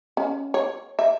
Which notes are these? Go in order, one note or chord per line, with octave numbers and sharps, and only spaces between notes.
C#4
C#5
E5